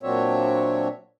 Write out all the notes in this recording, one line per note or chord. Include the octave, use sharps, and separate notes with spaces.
A#2 F#3 C4 D4 C#5 E5